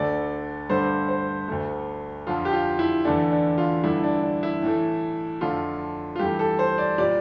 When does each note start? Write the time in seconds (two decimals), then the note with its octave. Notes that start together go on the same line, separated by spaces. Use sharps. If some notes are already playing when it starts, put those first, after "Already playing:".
Already playing: D2 D3 A3 D5
0.69 G2 D3 A3 C5
1.08 C5
1.48 D2 D3 A3
2.27 F2 D3 F3 F4
2.45 G4
2.53 F4
2.79 E4
3.05 E2 D3 A3 D4
3.32 D4
3.58 F4
3.84 G2 D3 A3 E4
4.04 D4
4.23 D4
4.43 E4
4.62 A2 E3 A3
5.41 F2 D3 A3 F4
6.16 F4
6.19 G2 E3 A3 G4
6.39 A4
6.59 C5
6.78 D5
6.98 A#2 G3 D5